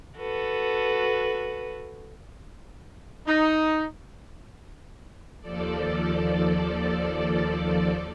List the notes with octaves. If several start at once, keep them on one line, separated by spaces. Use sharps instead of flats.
F#4 A4 B4
D#4
D#2 F3 A4 D5